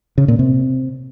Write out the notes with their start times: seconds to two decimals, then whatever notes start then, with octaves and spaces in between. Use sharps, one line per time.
0.18 C#3
0.28 A#2
0.39 C3